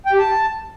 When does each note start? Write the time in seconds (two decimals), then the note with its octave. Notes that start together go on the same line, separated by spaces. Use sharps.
0.06 G5
0.12 G4
0.19 A5